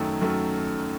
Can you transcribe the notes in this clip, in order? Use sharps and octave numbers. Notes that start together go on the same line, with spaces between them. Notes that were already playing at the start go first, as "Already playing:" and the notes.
Already playing: F#2 D#3 F#3 A3
F#2 D#3 F#3 A3